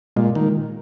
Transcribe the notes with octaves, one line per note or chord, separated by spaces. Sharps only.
A#2 G#3
D#3